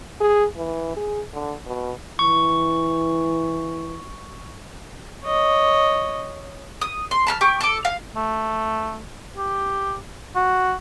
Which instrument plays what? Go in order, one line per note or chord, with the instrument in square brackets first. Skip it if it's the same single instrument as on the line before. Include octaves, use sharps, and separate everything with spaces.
[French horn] G#4
E3
G#4
D3
B2
[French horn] E3 [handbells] C#6
[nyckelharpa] C#5 D#5
[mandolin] D#6
C6
A5 B5 F6
G4 C#6 D6
A4 D6
F5
[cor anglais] A3
G4
F#4